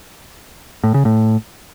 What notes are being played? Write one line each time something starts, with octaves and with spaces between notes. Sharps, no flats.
A2
C#3
A2